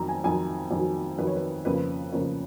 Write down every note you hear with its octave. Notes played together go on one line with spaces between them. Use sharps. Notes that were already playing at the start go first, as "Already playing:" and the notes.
Already playing: F2 D#3 F#3 A#5
G#5
F2 D#3 F#3 G#5
F2 D#3 F#3
F2 D#3 F#3 B4
C#5
B4
F2 C#3 F3 A#3 C#4 B4
F2 C#3 F3 A#3 C#4